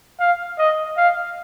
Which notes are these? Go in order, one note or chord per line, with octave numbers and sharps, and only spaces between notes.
F5
D#5
F5